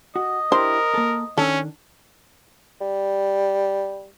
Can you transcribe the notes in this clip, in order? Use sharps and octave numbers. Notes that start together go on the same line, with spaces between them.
F#4 D#5
D4 E4 G4 A#4 C5
A#3 A4
D#3 C#4 D4 A4
G3